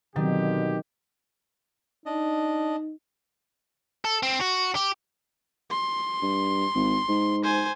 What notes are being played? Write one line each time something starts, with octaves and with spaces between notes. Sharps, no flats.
B2 D3 D#3 F#3 C4 G4
D4 D#4 D#5
A4
C4
F#4
G4
C6
G2
G#1
G#2
C5 G#5